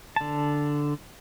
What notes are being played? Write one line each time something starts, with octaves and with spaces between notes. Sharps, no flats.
D3 A5